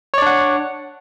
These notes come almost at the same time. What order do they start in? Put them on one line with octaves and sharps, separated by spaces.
C#5 D5 D4 F#5